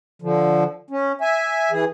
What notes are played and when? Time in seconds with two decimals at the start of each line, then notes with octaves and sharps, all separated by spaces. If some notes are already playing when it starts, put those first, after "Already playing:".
0.22 D3 F3
0.90 C#4
1.21 E5 G#5
1.71 E3 G#4